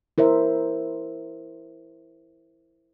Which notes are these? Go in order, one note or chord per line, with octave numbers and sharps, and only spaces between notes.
E4 A#4 C5 E5